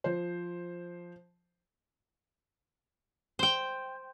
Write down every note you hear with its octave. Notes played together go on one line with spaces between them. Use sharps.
F3 C5
C5 G5